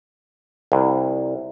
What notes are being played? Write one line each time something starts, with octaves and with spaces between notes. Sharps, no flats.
C2